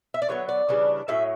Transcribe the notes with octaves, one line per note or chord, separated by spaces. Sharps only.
E5
D5
D3 F#3 B3 C#5
D5
C#3 E3 G3 D4
A2 F#3 C#4 E5